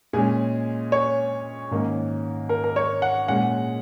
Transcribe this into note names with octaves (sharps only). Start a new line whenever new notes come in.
A#2 G#3 C#4 G#4
C#5
G#2 D#3 A#3 C#4
A#4
A#4
C#5
F#5
A#2 G#3 C#4 F#5